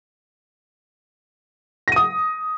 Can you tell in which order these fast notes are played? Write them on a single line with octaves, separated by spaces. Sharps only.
A#6 D#7 D#6